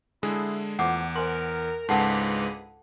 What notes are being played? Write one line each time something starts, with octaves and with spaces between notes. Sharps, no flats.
D3 G#3 E4 G#4
E2 F3 A3 F#5 D6
A#4 C5 G#5 C6
C#2 G#2 D4 G#4 A4 B4 F#5 A5